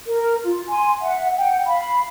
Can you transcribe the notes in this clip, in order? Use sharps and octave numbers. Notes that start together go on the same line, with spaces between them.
A#4
F4
G#5 C6
E5 F#5
F#5 G5
F5 B5